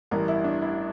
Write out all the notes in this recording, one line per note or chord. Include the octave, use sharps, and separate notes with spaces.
A1 G2 E3 A#4
E4
D4
E4